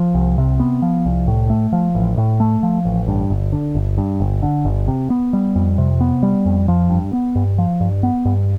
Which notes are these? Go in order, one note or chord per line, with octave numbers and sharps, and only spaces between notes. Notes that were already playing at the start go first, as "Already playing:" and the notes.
Already playing: F3
C2
C3
B3
F3
C2
A2
A3
F3
A1
A2
A3
F3
A1
G2
G1
D3
G1
G2
G1
D3
G1
C3
B3
G3
F2
C3
B3
G3
F2
F3
G2
B3
G2
F3
G2
B3
G2